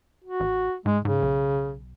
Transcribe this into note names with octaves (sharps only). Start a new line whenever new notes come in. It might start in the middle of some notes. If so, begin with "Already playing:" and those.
F#4
A1
G#2 G#3
G#2 C#3
B1